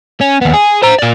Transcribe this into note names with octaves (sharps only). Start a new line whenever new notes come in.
C#4
D#2 B3
G#4
C5 A#5
A#2 D5